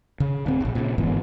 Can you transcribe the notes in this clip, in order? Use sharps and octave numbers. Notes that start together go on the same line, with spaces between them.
C#3
D1 C4
F1 A#1
A#2 C#3
G1 G#2 E3 B3